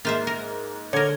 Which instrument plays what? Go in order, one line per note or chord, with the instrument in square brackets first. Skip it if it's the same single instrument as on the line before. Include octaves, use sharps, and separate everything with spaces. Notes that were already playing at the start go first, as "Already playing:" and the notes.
[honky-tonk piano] G#2 A#3 [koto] F4 C5 E5
[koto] A#4
[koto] D3 A#4 [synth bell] C#5 G#6